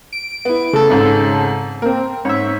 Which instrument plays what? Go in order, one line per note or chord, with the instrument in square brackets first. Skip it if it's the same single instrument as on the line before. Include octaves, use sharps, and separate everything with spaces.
[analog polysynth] D7
[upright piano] B3 E4
[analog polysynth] C#3 A4 [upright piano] A3
[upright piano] G#1 G#2
[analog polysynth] A#3 C4 [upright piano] A#4
[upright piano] G#2 [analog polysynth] C#5 E5